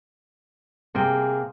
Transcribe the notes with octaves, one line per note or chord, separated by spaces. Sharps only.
C3 A#3 G#4 G5